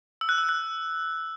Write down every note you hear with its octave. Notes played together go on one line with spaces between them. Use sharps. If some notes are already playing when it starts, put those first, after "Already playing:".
E6
F#6
E6
F#6